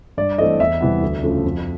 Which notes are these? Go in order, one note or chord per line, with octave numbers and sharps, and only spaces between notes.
G2 D5
E3 A3 C4 D#5
E2 E5
C3 E3 G3 B3
D2
C#3 F3 A3
F2